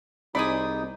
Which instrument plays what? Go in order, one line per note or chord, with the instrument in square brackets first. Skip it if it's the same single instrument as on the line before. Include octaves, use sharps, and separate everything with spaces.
[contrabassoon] C2 [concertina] D#4 [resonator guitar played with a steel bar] G#4 C5 D5 [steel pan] B5 D#6